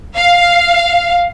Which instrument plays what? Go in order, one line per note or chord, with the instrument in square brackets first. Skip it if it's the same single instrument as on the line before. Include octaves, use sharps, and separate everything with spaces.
[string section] F5